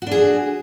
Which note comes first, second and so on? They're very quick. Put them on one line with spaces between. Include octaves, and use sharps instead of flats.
F#4 D4 G#4